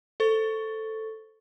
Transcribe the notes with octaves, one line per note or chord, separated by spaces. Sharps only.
A4 C5 C#6 A6